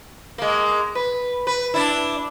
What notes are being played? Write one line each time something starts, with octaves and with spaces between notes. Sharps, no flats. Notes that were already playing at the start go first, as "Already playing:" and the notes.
G#3 A#3
B4
B4
D4 E4